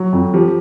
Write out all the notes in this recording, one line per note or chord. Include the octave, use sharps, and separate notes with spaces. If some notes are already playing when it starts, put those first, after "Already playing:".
Already playing: F#3
F2
F3 G4